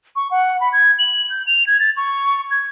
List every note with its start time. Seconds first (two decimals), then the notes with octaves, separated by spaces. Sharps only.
0.16 C#6
0.31 F#5
0.60 B5
0.73 G#6
0.99 F#7
1.30 G6
1.47 F7
1.67 G#6
1.80 A6
1.97 C#6
2.51 G#6